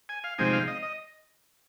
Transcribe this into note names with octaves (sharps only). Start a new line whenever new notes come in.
G#5
F5
C3 F3 G#3 C4 D#4 G#5
F5
D#5
D#5